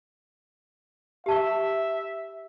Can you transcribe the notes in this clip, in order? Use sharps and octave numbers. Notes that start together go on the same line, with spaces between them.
G4 E5 A5 C#6